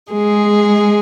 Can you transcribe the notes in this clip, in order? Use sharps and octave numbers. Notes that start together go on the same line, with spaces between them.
G#3 G#4